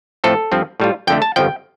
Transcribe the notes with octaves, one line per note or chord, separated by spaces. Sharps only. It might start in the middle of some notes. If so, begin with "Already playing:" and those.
A2 F3 A3 C4 F4 A4
G2 F3 C4
A2 G3 F4
F2 D3 A3 G5
A5
G1 F2 F3 G5